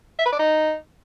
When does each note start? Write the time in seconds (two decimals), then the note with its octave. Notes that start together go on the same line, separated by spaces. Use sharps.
0.19 E5
0.26 B4
0.32 D5
0.39 D#4